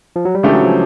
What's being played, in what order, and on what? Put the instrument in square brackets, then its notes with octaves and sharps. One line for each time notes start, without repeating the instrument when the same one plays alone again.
[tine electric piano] F3
F#3
G3
[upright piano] C#3 E3 A3 D4 G4 [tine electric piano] G#3
[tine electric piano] F#3
F3